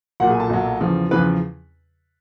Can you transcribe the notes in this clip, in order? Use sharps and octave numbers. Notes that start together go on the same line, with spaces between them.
B1 A#2 F#3 F#4 F#5
G#4 G#5
A4 A5
B1 A#2 F#3
E2 C#3 F3
E2 C#3 F3 B4 B5